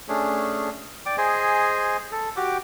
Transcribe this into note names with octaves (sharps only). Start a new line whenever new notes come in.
A3 C#4 D4 G#4
D5 G5 D6
G#4 C5 D#5 G#5
A4
F#4 G4 G5 D6